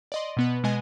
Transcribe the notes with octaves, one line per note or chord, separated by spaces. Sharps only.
D5 D#5 C6
B2 B3 B4
B2 G#3 B3 D#5 G#5